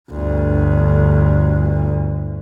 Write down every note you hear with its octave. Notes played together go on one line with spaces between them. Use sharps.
G1 D2